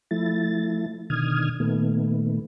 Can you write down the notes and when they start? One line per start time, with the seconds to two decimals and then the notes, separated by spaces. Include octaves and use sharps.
0.11 F3 A3 E4 A6
1.10 B2 D3 D#3 D#6 F6 G#6
1.60 A#2 D#3 A3 B3